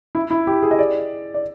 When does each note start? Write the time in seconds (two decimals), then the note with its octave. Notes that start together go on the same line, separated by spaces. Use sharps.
0.15 E4
0.30 E4
0.47 G4
0.63 G#4
0.71 D#5
0.79 D5
1.34 D5